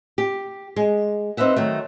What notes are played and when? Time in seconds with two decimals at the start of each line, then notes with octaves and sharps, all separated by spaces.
0.18 G4
0.76 G#3
1.37 C4 D#4 B4 E5 F#5
1.56 D#3 F#3 A3